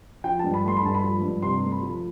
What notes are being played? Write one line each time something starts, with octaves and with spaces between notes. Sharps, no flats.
F3 G5
A5
G2
B5
A3 C6
B5
G2 A5
B5
F3
G2
C3 C6
A3
B5
F3